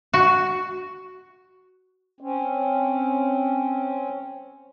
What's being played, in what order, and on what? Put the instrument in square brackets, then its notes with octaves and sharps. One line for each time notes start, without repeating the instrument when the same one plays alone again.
[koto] F#4
[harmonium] C4 C#4